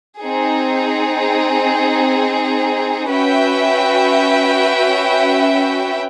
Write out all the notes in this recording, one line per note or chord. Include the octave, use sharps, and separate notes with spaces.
C4 D#4 G#4
C#4 F#4 B4 E5 G5